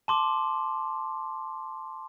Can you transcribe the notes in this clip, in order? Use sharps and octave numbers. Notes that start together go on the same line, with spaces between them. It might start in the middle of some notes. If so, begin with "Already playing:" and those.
A5 C6 D6